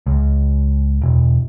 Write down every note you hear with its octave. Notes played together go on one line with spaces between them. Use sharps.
C#2
E1